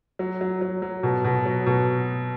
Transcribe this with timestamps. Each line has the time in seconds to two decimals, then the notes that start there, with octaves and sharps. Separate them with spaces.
0.19 F#3
0.41 F#3
0.61 F#3
0.82 F#3
1.03 B2
1.24 B2
1.45 F#3
1.66 B2